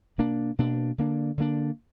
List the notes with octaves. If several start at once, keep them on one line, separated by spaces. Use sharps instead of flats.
B2 A#3 D4
B2 A#3 D4
D3 A#3 D4
D3 A#3 D4